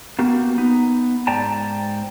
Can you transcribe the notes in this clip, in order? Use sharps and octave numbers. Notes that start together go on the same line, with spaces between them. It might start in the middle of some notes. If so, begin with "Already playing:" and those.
A#3 B3 F#4 G4
B3 D#4
G#2 D5 G5 A5 A#5